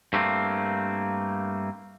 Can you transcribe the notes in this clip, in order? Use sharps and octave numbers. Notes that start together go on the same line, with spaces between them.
G2 A3 A#3 C4